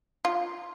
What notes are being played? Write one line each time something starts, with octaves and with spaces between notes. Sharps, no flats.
F4